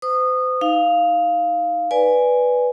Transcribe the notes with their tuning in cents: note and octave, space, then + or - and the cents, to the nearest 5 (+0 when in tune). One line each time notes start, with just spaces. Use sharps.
C5 -40 D#6 -20
D#4 +15 F5 +0
B4 +0 D5 +0 G#5 +0